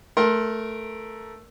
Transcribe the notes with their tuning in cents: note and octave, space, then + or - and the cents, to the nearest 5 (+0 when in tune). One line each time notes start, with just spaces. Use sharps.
A3 +0 A#4 +10 C6 +30